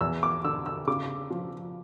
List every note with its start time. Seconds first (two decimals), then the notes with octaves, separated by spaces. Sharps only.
0.01 E2 E6
0.23 D6
0.44 D3 E6
0.66 E6
0.87 C#3 D6
1.31 F3